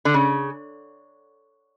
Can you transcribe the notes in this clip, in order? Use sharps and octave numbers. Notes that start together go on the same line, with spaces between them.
D3
C#3